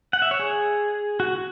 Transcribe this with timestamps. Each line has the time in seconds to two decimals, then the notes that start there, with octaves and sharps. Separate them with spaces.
0.13 F#5
0.22 E5
0.31 C#5
0.40 G#4
1.20 F#4